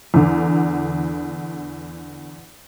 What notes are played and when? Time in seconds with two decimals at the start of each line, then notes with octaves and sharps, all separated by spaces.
0.14 E2 D3